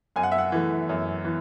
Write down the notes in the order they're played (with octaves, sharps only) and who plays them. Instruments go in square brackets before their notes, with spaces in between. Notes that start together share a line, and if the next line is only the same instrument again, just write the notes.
[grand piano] F#2 G#5
F#5
E5
F#5
E3 A3
F#2
E3